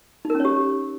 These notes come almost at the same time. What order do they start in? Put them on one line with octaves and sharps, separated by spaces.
D#4 A#4 C#4 C#5 G4